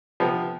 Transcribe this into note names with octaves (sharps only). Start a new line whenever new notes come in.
C3 F3 B3